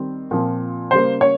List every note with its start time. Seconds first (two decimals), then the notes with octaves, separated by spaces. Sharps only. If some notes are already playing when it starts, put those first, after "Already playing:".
Already playing: D#3 G3 C4
0.31 A#2 F3 C4
0.91 C#3 G3 A#3 C5
1.21 C#5